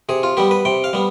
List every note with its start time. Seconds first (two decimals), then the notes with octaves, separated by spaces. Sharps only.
0.09 C3 G#4
0.23 F4
0.37 G3 B3 G4
0.51 B4
0.65 C3 G5
0.84 F5
0.93 G3 B3